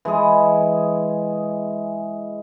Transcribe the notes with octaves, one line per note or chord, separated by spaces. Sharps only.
E3 G#3 G#4